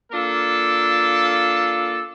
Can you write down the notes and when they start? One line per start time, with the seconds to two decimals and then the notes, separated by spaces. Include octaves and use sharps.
0.12 A#3 D4 F4 A4